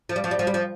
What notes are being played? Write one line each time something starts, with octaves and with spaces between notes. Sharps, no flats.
F3
G3
F3
G3
F3
G3
F3